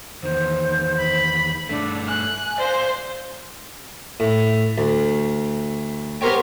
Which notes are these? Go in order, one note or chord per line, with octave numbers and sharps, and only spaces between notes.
E2 D#3 C5
B5
G2 A3 D4
G#5 F#6
C5 D5 E5 F5
A2
D2
B3 G4 A#4 C5 C#5 G5